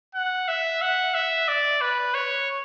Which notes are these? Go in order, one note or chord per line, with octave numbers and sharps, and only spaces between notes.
F#5
E5
F#5
E5
D5
B4
C#5